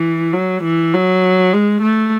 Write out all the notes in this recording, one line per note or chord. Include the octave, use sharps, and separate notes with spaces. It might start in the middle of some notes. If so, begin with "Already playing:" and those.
Already playing: E3
F#3
E3
F#3
G#3
A3